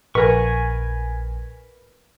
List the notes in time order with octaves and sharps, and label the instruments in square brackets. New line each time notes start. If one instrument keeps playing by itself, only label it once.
[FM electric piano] A#1 [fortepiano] A#4 B4 [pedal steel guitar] G#5 C#6